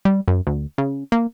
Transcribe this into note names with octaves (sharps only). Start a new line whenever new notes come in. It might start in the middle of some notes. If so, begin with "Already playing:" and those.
G3
F#2
D2
C#3
A#3